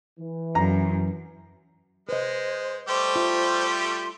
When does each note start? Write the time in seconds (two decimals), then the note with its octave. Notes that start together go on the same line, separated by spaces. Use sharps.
0.19 E3
0.55 F#2 A#5
2.09 G#3 B4 C5 D#5
2.88 G3 A3 G4 C5 C6
3.16 F4 E5